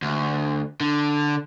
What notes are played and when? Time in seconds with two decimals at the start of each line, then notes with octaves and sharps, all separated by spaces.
0.02 D2
0.80 D3